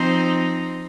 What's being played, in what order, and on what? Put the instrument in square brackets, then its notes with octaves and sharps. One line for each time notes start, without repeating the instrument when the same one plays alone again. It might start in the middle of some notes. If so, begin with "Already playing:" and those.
Already playing: [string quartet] F3 C4 D#4 C5